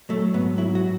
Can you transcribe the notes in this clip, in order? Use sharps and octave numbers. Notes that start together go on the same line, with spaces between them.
F#3 A3
G#2 B3
F#3 E4
F#4